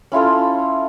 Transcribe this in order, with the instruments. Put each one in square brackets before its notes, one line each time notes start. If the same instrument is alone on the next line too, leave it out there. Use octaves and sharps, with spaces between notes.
[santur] C#4 E4 F4 A4